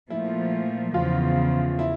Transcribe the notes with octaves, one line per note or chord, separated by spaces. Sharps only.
A#2 F3 A3 E4
E2 C#3 F3 F4
E4